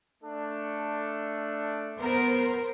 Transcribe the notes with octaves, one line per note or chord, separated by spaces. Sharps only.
A3 D4 A4
B3 A#4 C5